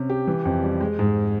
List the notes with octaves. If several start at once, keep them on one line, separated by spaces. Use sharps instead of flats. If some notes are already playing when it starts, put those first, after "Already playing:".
Already playing: C3 C#4
G4
E3
F2
G3
G#3
G#2